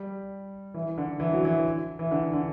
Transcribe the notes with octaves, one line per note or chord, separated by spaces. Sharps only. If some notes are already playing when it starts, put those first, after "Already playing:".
Already playing: G3
E3
D3
E3
F#3
E3
E3
D3
D3